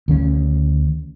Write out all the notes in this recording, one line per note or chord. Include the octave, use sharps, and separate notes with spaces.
D2 D#3 C#4